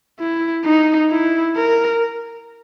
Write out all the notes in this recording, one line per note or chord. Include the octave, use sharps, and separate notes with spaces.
E4
D#4
E4
A#4